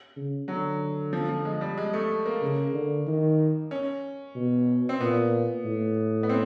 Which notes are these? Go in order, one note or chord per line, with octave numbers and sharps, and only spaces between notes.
C#3
D3 F#3
F3
F3
G#3
G3
G#3
A3
A#3
C#3
D3
D#3
C#4
B2
C4
A#2 B3
A2
B3
C4